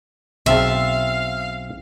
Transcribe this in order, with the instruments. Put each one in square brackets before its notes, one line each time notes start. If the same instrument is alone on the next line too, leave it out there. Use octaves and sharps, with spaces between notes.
[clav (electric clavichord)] B1 C4 A5 [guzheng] E5 [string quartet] F5